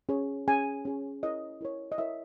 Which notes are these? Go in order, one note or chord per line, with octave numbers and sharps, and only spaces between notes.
C#4 G#4 C#5
C#4 G#4 C#5 G#5
C#4 G#4 C#5
E4 A#4 C#5 D#5
E4 A#4 C#5
D#5
E4 A#4 C#5 E5